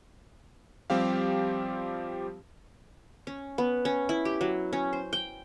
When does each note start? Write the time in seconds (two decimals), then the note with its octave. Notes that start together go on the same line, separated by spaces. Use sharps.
0.90 F3 G3 C4 G4 F5
3.27 C#4
3.58 B3
3.85 C#4
4.09 E4
4.25 G4
4.41 F#3
4.73 C#4
4.93 C5
5.13 G5